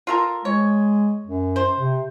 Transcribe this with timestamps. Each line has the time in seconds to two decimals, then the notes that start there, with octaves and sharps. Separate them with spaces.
0.07 F4 A4 A#4
0.45 G#3 C#5
1.27 F#2
1.56 C5
1.78 C3